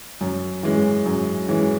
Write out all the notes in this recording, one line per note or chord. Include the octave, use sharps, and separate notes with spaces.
F#2
E3 G#3 C#4
F#2
E3 G#3 C#4